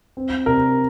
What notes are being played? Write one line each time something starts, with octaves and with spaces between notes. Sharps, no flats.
C4
C3 A#4